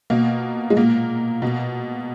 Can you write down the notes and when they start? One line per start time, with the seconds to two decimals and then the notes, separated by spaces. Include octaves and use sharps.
0.10 B2 A#3
0.70 G#3
0.77 A#2 A#3
1.42 B2